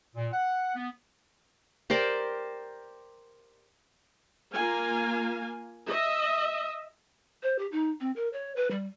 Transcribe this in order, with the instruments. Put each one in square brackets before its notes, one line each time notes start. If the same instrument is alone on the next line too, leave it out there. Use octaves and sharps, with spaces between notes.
[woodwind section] A#2
F#5
B3
[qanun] G4 A#4 C5 D5
[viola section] A#3 F4 F5 G#5
D#5 E5
[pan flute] C5
G4
D#4
C4
A#4
C#5
B4
G3